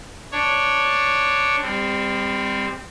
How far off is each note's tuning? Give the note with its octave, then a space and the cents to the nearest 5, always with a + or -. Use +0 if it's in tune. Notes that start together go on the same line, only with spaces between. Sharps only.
D4 +0 C#5 +0
G3 +30 C4 -10